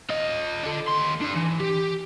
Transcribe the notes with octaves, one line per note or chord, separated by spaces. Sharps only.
F4 D#5
D4 A4
D#2 C6
G3 D4
E3
G4